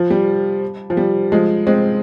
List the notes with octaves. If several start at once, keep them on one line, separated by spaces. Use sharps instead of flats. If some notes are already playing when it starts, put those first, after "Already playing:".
Already playing: F3
G3
F3
G3
F3 G#3
G#3 C4